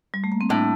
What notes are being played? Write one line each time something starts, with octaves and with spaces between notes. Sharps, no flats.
G3
A3
A#3
C4
A2 D4